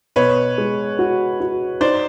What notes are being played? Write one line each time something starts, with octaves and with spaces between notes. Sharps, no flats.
B2 B4 C#5
G#3
F#4
F#4
D#4 C5 D5